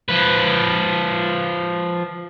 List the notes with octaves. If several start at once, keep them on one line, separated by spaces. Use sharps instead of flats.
F3 B4